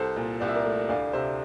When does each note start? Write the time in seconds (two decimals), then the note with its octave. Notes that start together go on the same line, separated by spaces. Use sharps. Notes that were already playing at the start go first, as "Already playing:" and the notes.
Already playing: C2 A4 C5
0.16 A#2
0.40 C2 D5
0.48 E5
0.55 A#4 D5
0.65 A3
0.89 D2 D5 F5
1.13 C3 C5 E5